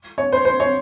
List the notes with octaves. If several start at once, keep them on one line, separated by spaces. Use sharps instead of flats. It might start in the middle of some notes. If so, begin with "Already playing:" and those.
C#5
C5
C5
C#5